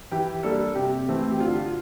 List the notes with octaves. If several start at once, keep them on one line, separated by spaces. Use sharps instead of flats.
E3 G4
G3 A#3 D4 A4
C3 G4
E3 A3 C4
G4
D3 F4
F4